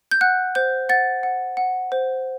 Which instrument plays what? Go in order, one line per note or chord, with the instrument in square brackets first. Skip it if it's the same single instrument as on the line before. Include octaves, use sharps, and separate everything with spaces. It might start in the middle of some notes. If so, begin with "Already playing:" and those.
[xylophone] G6
F#5 F#6
C5 G6
F#5 A6
F#5
F#5
C5